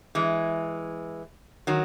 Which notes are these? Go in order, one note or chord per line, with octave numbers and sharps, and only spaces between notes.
E3 G#3
D#3 F#3